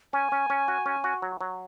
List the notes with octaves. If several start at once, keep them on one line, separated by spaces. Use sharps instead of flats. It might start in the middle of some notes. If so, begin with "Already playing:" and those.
C#4 G#5
C#4
C#4
F#4
C#4
F#4
F#3
F#3